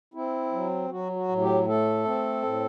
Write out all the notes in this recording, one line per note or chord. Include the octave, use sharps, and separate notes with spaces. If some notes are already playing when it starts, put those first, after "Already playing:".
C4 E4
F#3
F#3 F#4
F#4
A2
G4
A3 A4
C4
A2